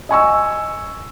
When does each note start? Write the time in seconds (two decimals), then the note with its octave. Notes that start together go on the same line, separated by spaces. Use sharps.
0.09 D#5 G#5 C#6 E6